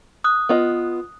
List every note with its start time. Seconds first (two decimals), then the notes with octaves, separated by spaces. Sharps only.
0.24 D#6 F#6
0.49 B3 F4 D#5